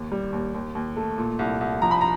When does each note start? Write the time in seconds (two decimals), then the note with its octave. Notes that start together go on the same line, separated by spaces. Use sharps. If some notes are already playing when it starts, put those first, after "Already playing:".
Already playing: D#2
0.12 G3
0.33 D#2
0.54 D#2
0.75 D#2
0.97 A3
1.18 A#2
1.39 C2
1.61 C2
1.82 F3 A#5
1.91 B5
2.01 A#5